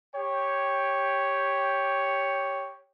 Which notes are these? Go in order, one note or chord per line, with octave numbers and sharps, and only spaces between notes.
G4 C#5 G5